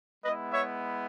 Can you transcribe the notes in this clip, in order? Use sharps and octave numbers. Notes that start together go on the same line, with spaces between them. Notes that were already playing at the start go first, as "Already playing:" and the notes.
G#3 B3 E4 B4 D#5
C#5 E5